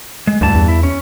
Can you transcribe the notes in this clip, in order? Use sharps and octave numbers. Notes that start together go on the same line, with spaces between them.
G#3
D2 G2 E3 A5
E2
E4
C#4